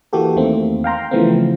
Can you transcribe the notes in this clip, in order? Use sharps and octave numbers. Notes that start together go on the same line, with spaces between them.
E3 A#3 F#4 G4 A4
E2 D#3 A3 A#3 C4
F5 G5 A#5 C6
C#3 E3 F3 A3 B3 C4